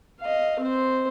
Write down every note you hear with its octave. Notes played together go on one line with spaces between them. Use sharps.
D#5 F5
C4 C5